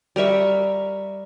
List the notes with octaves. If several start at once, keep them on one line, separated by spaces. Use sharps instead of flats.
G3 A#4 E5 C#6